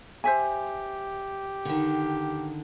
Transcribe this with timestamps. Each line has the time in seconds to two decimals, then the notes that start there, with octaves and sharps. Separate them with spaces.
0.24 G4 C5 E5 G#5
1.65 D3 D#3